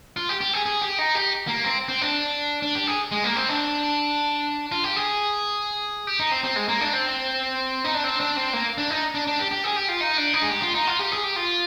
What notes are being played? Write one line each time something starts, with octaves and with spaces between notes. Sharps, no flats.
F4
G4
G4
G#4
G#4
G4
D#4
G4
A#3
C4
C4
D4
D4
G4
G#4
G#3
A#3
C4
D4
F4
G4
G#4
G4
D#4
C4
C4
G#3
A#3
D4
C4
D#4
D4
C4
D4
C4
A#3
D4
D#4
D4
D4
G4
G4
G#4
G4
F4
D#4
D4
D#4
G#4
G4
F4
D#4
F4
G4
G#4
G4
F4